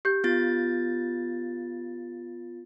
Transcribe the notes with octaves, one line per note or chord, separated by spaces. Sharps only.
G4 G6
B3 F4 A6